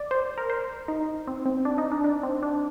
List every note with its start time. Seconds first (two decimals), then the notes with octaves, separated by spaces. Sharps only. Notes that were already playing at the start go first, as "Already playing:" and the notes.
Already playing: D5
0.11 C5
0.38 A#4
0.50 C5
0.88 D#4
1.27 C4
1.46 C4
1.65 D4
1.78 D#4
1.92 D4
2.04 D4
2.23 C4
2.43 D4